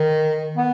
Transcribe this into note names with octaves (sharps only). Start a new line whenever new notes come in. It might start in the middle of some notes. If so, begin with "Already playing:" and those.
Already playing: D#3
B3